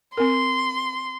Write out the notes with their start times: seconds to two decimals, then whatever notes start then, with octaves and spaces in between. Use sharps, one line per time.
0.17 C4 A#4 C6